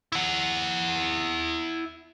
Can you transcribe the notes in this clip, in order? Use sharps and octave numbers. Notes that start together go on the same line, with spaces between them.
E4 F#5